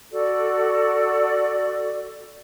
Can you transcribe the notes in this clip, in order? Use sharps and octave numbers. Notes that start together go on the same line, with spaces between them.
F#4 A4 D5